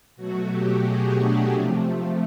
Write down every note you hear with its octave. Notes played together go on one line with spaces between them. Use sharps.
B2 F#3 A3 F#4
G4
G#4
D4
C3 F3 A3